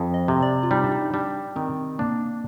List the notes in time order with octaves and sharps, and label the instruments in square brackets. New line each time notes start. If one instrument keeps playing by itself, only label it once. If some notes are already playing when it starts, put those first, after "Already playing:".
Already playing: [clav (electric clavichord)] F2
[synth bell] D#5
[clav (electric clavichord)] C3
[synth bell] D5
F4
[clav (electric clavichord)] G3 [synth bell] D#4
[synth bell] D4
D#4
[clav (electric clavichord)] G3 [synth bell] D4
[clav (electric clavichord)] D#3 [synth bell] C4
[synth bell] A#3 [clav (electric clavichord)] D4